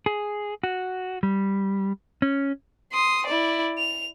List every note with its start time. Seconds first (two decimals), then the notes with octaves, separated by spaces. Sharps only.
0.06 G#4
0.64 F#4
1.23 G3
2.22 C#4
2.92 C6 D#6
3.27 E4 D5
3.78 F7